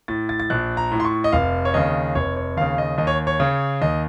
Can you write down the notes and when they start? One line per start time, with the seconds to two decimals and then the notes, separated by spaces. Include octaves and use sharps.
0.08 A2 A6
0.29 A6
0.40 A6
0.50 A#1 F#6
0.77 A#5
0.92 A2
1.00 C6
1.05 C#6
1.24 D#5
1.32 F1 F5
1.65 C#5
1.74 D#2 C#3 D#5
2.15 F1 C#5
2.36 C#5
2.57 D#2 C#3 F5
2.78 D#5
2.98 D#2 D#5
3.07 C#5
3.27 C#5
3.40 C#3
3.82 D#2 D#5